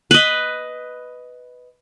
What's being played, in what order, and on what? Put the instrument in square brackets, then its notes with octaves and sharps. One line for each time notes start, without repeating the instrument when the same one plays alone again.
[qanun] B4 D#5